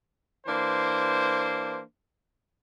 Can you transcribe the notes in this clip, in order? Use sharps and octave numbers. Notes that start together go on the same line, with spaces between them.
E3 A#3 D4 C5